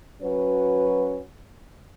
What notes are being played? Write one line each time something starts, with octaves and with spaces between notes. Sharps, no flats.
F#3 C#4 F#4 B4